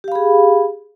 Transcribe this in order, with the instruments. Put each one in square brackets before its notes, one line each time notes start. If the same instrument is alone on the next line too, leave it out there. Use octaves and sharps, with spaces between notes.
[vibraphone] G4
F5
B5
G#4